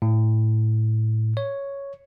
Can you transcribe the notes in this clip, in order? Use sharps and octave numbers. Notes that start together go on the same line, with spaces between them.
A2
C#5